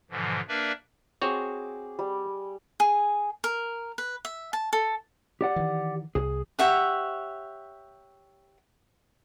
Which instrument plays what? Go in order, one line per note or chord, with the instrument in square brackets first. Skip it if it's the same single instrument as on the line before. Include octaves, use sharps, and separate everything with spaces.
[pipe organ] G#2 B2 D3 E3 F3
A#3 D4 A#4 B4 D5 E5
[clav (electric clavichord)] C4 F#4 C#5 [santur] G#4 D6
[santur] G3
[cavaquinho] G#4
A#4
B4
E5
A5
A4
[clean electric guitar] G4 D5 F#5
[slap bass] D#3 E3
[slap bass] C2 [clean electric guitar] G#4
[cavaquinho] G4 C#5 E5 F#5